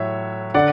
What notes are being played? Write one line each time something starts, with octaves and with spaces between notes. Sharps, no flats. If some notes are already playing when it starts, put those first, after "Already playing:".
Already playing: A2 F#3 C#5 E5
D3 D5 F#5